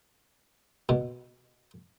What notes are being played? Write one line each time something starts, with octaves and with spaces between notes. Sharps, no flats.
B2